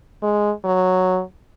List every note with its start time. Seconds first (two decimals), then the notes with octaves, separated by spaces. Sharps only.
0.23 G#3
0.64 F#3